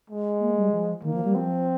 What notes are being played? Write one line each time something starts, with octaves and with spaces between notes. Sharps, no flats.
G#3
A#3
G3
F3
D#3 A#3
F3
G3
F3 C4